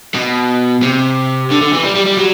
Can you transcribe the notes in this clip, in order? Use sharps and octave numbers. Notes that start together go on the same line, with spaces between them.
B2
C3
D3
D3
E3
G3
G3
G3
F#3